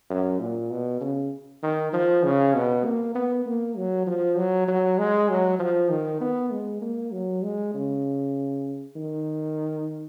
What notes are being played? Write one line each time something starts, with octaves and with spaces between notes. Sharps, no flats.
F#2
A#2
B2
C#3
D#3
F3
C#3
B2
A#3
B3
A#3
F#3
F3
F#3
F#3
G#3
F#3
F3
D#3
B3
G#3
A#3
F#3
G#3
C#3
D#3